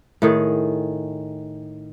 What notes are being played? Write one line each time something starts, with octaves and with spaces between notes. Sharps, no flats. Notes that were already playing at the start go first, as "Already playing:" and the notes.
A2 D#3 G#4